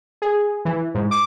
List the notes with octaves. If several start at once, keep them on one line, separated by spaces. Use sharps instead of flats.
G#4
E3
G#2
D6